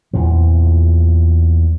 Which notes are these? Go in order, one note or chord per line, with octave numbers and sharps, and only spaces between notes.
E2 A#2 F3